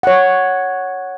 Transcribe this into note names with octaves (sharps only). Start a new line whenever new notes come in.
C#5 F#5